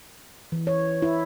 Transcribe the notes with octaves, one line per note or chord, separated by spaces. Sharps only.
E3
C#5
E4